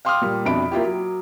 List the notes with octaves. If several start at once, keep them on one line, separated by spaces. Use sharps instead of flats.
F5 G5 C6 D6 D#6 F6
A#2 G3
F2 B2 D4 E5 B5 D7
A#3 E4 F4 G4
F#3